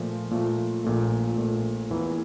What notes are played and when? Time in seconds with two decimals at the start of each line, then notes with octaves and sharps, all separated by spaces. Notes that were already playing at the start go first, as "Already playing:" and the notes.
Already playing: A#2 F3 A3
0.31 A#2 F3 A3
0.84 A#1 A#2 A3
1.38 A#1 A#2 A3
1.90 E2 E3 A#3